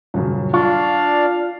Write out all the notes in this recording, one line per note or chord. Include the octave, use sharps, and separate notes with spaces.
D#1 F#2 C#3
D4 F4 D5 F5 C#6 F6